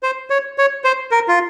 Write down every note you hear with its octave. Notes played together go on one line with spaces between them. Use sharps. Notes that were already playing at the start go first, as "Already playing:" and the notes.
C5
C#5
C#5
C5
A#4
F4